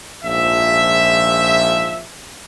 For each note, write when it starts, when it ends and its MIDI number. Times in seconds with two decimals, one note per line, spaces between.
0.25 2.04 34
0.25 2.04 44
0.25 2.04 53
0.25 2.04 76